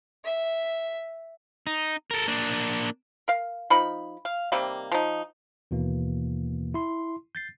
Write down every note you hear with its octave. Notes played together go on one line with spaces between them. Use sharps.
E5
D#4
A4 A#4
A#3 D4
A#4 F5
F3 D#4 B5
F5
C3 D#3 G3 A#3
F3 D#4
D#2 B2 E3 A#3
E4 C6
G6 A6 C7